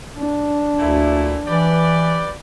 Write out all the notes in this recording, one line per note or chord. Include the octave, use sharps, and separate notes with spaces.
D4
D2 A#2 A3 E4
E3 G4 B4 D5